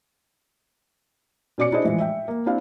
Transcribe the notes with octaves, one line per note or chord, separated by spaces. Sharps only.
B2 C#4 D5 D6 C#7
D4 E4 G#4 C5 D#5
A2 E3 F3 G#3
E5 G5
A#3
C4 D4 E4 F5